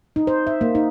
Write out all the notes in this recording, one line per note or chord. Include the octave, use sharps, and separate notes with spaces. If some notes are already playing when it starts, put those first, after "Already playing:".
D#4
C5
E5
A#3
D#4